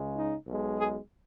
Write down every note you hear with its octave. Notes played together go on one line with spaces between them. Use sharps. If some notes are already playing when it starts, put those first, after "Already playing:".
Already playing: C#2 C#3 G#3
D#4
B1 B2 G#3
G#4